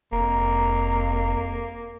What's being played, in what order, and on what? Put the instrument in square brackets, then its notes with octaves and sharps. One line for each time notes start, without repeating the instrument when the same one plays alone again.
[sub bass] F1 [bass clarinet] F2 [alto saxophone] A#3 [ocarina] A#5